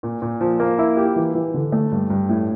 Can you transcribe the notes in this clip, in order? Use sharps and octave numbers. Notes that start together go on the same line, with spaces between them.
A#2
A#2
F3
A#3
E4
G4
E3
E3
D3
A3
G2
G2
A2